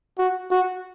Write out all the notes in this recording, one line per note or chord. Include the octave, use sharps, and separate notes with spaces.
F#4
F#4